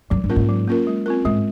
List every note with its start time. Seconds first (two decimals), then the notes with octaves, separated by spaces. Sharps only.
0.10 F#2 F#3
0.24 G2
0.30 A#3 C#4 F4 A#4
0.36 G#2
0.49 F#3
0.67 A#3 C#4 F4 A#4
0.87 G#3
1.06 C4 F4 A#4
1.25 G#2 G#3